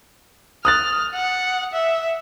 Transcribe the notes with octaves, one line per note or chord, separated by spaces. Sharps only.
D#6 F6 F#6 A6
F#5
E5